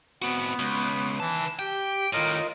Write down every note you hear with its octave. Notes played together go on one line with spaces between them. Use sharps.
B3 C4 F#4
C#2
D#3 E3 A5
G4 G5
A2 D#3 F4 A#4 D#5